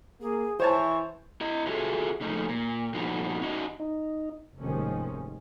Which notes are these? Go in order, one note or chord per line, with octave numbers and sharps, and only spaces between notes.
A#3 G#4
E3 C5 C#5 A5 C#6
E4 D#5
F4 F#4 G#4 A4 C#5 E5
F2 G#2 A3 C#4 D#4
A#2
G2 A#2 F3 B3 D#4 F#4
C#4 D#4 F#4 D#5
D#4
F1 D#2 G#2 D#3 F3 C#4